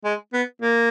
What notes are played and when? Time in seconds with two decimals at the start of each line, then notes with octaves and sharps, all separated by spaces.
0.05 G#3
0.33 B3
0.62 A#3